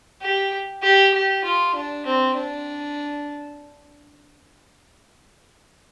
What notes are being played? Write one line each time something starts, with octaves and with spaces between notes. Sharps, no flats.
G4
G4
G4
F4
D4
C4
D4